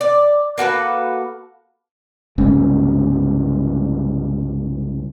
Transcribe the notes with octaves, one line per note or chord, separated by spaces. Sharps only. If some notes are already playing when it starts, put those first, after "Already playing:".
D5
A#3 F#4 A4 B4
C2 G2 C#3 G#3